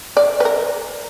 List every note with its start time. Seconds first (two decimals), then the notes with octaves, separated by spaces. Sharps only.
0.17 D5
0.40 B4
0.45 A#4